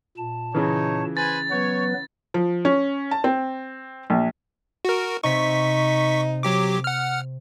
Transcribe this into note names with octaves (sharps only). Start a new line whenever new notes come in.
A#2 A5
C#3 E3 D#4 C#5
B4 C5 G#5 A6
F#3 B3 B4 C#5
F3
C#4
A5
C4
A#1
F#4 A#4
C3 C4 D#4 C#6 B6
F#3 G4 D6
F#5 F6